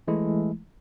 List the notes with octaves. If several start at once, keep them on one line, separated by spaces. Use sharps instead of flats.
E3 G#3 A3 E4